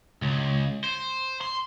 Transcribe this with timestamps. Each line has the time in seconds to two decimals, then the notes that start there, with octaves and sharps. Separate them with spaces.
0.22 C#2
0.84 C5
1.41 C6